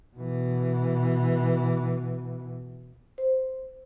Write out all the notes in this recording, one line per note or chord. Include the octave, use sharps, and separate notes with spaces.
B2 E3
C5